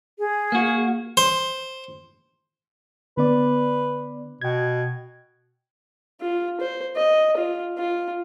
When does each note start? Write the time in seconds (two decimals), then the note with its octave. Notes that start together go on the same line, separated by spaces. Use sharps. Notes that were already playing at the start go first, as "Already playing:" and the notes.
0.19 G#4
0.52 A#3 F#4
1.17 C5
3.17 D3 B3 B4 D5
4.41 B2 G5 G#6
6.21 F4
6.60 C5
6.96 D#5
7.37 F4
7.78 F4